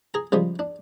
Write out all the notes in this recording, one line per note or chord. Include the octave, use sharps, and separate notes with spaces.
G#4 A#5
C#3 F3 G3 G#3
D4